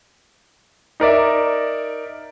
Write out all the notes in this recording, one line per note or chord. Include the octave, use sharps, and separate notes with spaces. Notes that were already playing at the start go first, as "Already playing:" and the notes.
D#4 A#4 D5 E5